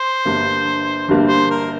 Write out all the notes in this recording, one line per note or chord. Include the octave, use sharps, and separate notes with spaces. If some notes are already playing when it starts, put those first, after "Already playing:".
Already playing: C5
G1 G2 G3 A#3
G1 G2 G3 A#3
C5
A#4